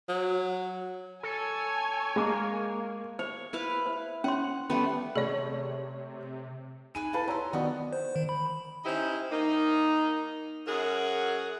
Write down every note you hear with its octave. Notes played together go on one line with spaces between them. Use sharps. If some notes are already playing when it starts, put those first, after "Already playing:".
F#3
A4 C#5 G#5
G#3 A#3
C5 C#5
E4 B4 F5
C5
C#4 C#5 F#5 C6
G3 A3 B3 C#4
C3 A3 G#4 C#5 D5
D#4 G#4 B4 G#5 D#7
E4 A4 B4 F5 A5
G4 C5 C#5 A#5 E6
D#3 B3 F#4 G4 B4 D5 D#6
C5
D#3
B5
C#4 D#4 E4 G4 C5
D#3 A#3 D#4
F#2 F#3 G#4 A#4 F#5